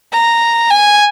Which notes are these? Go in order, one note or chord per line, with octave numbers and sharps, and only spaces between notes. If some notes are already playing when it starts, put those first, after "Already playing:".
A#5
G#5